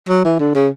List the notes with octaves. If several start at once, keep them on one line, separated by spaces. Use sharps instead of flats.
F#3
E3
D3
C#3